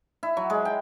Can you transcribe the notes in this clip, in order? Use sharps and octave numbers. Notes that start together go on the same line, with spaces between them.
E4
F#3
G#3
G5